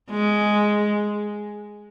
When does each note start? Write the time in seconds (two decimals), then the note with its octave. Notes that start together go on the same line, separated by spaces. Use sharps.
0.10 G#3